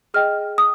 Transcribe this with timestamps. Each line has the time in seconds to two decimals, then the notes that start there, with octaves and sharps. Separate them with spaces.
0.14 G#4 D#5 G5 F6
0.58 D#6